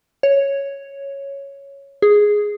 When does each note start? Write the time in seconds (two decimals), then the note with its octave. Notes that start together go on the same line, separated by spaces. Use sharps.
0.23 C#5
2.02 G#4